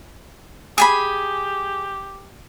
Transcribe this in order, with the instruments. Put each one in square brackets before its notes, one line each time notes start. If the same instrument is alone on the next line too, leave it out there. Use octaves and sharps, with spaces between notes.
[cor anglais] G4 [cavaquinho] G#4 G#5 B5